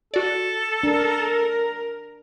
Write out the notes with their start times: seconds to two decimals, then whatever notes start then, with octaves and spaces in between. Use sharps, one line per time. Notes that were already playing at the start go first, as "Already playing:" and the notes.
0.14 F#4 A4 D5
0.83 D4 A#4